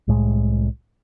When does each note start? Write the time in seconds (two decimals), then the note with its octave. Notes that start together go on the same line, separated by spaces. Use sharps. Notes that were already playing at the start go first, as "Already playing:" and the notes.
0.08 C2 A2 G#3